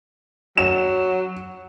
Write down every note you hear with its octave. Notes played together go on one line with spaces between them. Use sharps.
F#3 E7